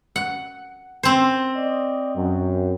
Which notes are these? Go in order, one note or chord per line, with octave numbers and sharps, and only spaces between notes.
F#5
C4 C5
D5 D#5
F#2